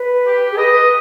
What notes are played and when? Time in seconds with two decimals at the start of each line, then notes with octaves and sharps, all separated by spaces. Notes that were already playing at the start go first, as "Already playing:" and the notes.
Already playing: B4
0.25 G4
0.51 G#4
0.58 B4 D#5
0.74 B4